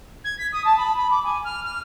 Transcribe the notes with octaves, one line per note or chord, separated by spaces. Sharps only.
G#6
B6
D#6
A5
B5
B5
D6
G#5
F6
F6